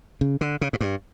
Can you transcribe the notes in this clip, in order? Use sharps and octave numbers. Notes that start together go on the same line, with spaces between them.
C#3
D3
C#3
G#2
G2